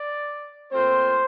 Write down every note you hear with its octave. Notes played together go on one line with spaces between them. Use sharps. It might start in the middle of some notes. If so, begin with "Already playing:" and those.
Already playing: D5
A#2 A3 C4 F4 C5